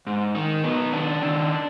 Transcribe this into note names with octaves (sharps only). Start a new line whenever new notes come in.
G#2
D#3 D#4
F#3 B3
D#3 D4
D#3